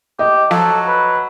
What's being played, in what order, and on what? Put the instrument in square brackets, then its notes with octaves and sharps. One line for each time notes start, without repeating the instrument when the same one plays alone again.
[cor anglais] G4 [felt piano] D#5
[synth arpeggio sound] F3 [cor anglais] F#3 [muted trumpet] A4
[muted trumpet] B4